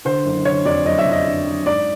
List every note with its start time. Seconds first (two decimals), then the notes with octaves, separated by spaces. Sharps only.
0.05 D3 C5
0.25 F#1
0.45 D3 C#5
0.66 F2 D5
0.85 F#1 D#5
0.98 E5
1.05 F2
1.11 D#5
1.25 D3
1.45 F#1
1.66 G#2 D5